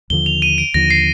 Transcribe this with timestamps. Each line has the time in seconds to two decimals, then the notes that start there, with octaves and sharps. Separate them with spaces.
0.10 D#2 D3 F3 G7
0.26 F7
0.42 D#7
0.58 D7
0.74 D#2 D3 F3 A#6
0.90 C7